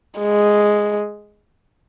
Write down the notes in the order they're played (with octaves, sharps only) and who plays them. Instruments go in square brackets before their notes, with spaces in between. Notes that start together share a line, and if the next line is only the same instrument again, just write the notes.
[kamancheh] G#3